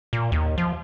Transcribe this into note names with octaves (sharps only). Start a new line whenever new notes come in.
A#2
D#2
F3